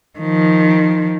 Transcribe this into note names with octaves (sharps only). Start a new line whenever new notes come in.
D#3 F3